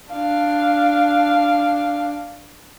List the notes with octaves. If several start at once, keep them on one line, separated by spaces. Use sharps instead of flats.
D4 F5